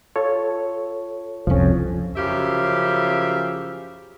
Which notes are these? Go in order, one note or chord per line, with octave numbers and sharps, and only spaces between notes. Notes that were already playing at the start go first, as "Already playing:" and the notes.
F4 A4 C#5
C2 F2 F3 C#4
F#2 C#3 F3 G4 E5 F5